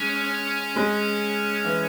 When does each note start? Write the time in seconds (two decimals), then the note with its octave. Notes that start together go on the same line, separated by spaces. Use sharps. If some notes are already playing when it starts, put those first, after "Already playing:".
Already playing: G#3 C#4
0.76 G#3
1.65 E3